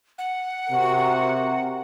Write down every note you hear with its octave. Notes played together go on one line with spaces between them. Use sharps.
F#5
C3 F#4 A#4